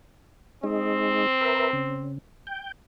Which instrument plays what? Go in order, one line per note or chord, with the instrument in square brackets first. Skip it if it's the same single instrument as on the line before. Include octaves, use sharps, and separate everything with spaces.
[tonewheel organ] G#3 D#4 [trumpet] C4
[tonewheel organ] A#4 B4 E5
C#3
G5